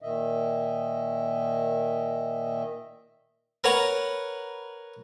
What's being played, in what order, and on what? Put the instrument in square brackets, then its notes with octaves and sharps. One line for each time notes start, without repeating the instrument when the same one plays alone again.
[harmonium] A#2 D#3 D#5 E5
[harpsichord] A#4 B4 C#5 F#5 A#5